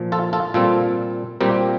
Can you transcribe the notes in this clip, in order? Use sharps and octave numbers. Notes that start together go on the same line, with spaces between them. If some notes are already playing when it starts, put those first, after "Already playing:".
Already playing: A#2 F3 A#3
F4 A4
F4 A4
A#2 G3 C4 F4 A4
A#2 G3 C4 G4 A#4